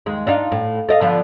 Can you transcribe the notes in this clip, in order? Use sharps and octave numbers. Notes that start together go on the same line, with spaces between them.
D#2 G#3
D4 D#4 F4
A2
A4 D#5 F5
D3 F3 B3